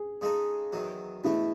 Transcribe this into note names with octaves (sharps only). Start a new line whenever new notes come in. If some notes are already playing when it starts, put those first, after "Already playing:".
Already playing: G#4
C#3 G#3 D#4 A4
E2 D#3 F#3
E2 B2 A3 E4